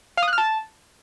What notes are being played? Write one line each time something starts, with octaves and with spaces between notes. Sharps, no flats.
F5
D#6
F#6
F6
A5